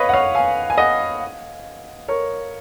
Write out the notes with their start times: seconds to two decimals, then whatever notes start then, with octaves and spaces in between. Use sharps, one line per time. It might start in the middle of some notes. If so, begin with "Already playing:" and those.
Already playing: B4 C#5 D#5 F5
0.09 F#5
0.13 C#5 F5
0.35 F5 G#5
0.70 G#5
0.78 D#5 F#5
2.08 A#4 C#5